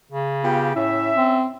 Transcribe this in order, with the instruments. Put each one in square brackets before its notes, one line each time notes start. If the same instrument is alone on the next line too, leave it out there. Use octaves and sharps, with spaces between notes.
[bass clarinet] C#3
[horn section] B3 F4 G4
[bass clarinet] A2 [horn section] C#4 E5
[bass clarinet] C4